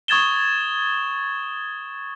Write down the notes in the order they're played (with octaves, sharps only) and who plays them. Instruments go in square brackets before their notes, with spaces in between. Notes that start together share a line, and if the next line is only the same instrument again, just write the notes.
[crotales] C#6 D#6 G#6 A6 E7 G7